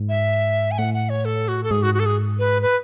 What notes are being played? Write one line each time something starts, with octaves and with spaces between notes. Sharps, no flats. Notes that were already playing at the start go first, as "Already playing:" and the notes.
Already playing: G#2
E5
G#5
A2 F#5
F#5
C#5
A4
F#4
A4
G#2 G#4
F#4
F#4
A4
G#4
B4
B4